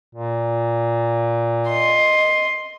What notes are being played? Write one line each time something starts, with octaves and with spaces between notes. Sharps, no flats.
A#2
D#5 C6